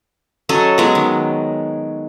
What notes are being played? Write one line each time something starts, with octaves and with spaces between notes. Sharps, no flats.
F#3 C#4 A4 D#5
F#3 G#3 B3
D#3